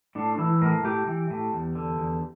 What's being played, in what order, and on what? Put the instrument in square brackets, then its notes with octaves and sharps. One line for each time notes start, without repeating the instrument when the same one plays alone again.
[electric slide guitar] A2 D4
E3 E4
A2 A#4
A2 G4
E3
A2
E2
D3
E2